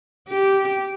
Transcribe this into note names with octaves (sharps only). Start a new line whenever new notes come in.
G4